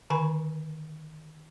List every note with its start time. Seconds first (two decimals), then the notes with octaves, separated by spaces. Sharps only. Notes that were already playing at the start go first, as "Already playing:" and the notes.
0.10 D3 D#3 B4 G#5 B5 C#6